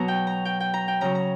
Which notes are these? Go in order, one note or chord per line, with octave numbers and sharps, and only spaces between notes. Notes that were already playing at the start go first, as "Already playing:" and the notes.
Already playing: B2 F#3 A#5
G5
A#5
G5
G5
A#5
G5
C#3 F#3 A#5
A#5